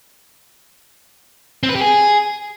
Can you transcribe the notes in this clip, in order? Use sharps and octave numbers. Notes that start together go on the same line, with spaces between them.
C4
B4
G4
G#4